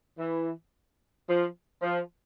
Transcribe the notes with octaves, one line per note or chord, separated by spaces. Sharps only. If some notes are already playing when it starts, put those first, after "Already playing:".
E3
F3
F3